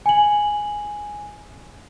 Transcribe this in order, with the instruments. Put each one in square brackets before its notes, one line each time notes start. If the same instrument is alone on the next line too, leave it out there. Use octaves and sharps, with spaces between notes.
[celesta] G#5 F#7